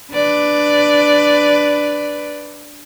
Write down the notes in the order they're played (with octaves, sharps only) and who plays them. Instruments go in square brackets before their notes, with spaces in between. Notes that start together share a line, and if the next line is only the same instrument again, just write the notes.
[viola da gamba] D4 B4 D5